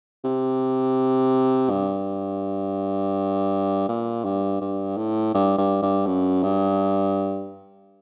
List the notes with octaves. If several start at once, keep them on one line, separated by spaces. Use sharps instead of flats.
C3
G2
A#2
G2
G2
A2
G2
G2
G2
F#2
G2